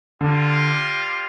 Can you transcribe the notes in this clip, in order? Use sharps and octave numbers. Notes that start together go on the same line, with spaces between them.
D3 G3 A#3 F4